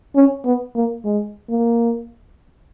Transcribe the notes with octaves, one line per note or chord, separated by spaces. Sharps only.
C#4
B3
A#3
G#3
A#3